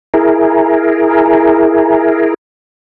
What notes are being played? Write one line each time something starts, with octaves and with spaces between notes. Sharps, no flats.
E4 G#4 A#4